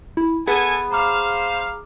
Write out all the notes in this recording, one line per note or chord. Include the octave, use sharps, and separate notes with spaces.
E4
B3 G#4 A4 G#5
C5 F5 A#5 D6 F6